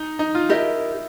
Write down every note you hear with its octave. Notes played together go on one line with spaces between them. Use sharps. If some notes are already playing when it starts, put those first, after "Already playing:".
Already playing: D#4
D#4
F4
E4 G4 A#4 D#5